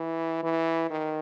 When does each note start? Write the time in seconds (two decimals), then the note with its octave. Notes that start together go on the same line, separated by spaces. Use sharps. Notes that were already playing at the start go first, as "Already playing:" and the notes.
Already playing: E3
0.43 E3
0.90 D#3